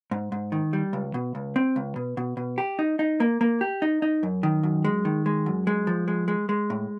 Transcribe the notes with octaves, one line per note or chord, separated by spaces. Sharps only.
G#2
G#2
D#3
G3
C#2
B2
C#2
C4
C#2
B2
B2
B2
G4
D#4
D#4
A#3
A#3
G4
D#4
D#4
F#2
D#3
F#2
G#3
D#3
G#3
F#2
G#3
F3
G#3
G#3
G#3
A2